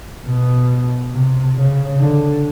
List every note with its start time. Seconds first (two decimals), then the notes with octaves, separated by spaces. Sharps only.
0.25 B2
1.12 C3
1.56 C#3
1.99 D3